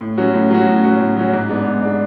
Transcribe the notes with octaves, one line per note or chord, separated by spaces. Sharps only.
A2
F#3 C#4 F#4
A2
F#3 C#4 F#4
A2
F#3 C#4 F#4
A2
F#3 C#4 F#4
G#2
G#3 B3 D4
G#2
G#3 B3 D4